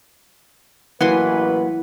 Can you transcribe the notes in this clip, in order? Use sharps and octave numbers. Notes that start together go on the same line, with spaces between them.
A1 E3 F#3 A#3 B4 F#5 G#5 C6